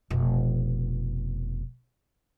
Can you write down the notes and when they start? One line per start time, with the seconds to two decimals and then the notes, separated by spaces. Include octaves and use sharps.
0.10 F1 B2